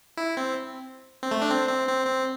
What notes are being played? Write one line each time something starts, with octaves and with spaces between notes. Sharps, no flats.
E4
C4
C4
A3
D4
C4
C4
C4
C4